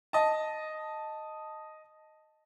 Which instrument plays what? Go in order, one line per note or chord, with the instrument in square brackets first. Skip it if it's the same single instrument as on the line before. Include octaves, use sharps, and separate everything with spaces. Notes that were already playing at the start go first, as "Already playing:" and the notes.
[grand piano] D#5 A5